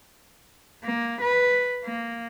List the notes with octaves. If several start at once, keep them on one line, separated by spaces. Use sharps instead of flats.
A#3
B4
A#3